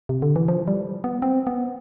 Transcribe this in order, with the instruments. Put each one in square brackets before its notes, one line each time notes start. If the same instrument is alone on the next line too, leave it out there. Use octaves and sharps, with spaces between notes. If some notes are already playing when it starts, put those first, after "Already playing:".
[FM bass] C3
D3
E3
F3
G3
B3
C4
B3